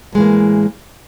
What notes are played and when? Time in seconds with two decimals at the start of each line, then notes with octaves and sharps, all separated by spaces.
0.13 A2
0.15 G#3
0.18 E3
0.20 A#3